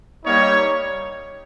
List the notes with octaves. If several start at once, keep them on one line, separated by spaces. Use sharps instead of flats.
G3 A#3 D#4 C#5